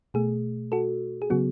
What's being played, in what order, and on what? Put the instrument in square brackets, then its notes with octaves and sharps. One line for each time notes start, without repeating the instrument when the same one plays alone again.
[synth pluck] B2 A3 G#4
F#4 A4
G#4
C#3 F#3 B3 F#4